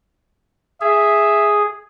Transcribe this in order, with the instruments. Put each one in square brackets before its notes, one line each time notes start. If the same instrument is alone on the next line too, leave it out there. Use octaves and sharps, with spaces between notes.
[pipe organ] G#4 [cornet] E5